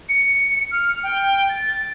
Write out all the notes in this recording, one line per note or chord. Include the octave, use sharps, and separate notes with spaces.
C#7
F6
G5
A6